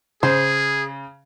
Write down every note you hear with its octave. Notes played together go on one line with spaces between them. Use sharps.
C#3 G#4 C5